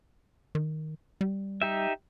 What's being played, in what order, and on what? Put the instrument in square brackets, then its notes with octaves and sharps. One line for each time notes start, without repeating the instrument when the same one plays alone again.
[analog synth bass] D#3
G3
[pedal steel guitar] D#4 G4 E5